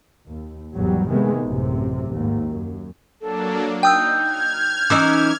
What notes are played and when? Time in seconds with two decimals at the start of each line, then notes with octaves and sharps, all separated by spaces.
0.29 D#2
0.74 G#1 E2 F#3 G3
1.08 C3 D#3 G#3 A3 B3
1.44 A1 F#2 C3
2.12 D#2 G#2
2.48 F#2
3.21 F#3 A#3 D4 A4
3.83 D#4 G5 D#6 E6 G6
4.18 F6 G#6
4.90 E3 C#4 D#4 D6 E6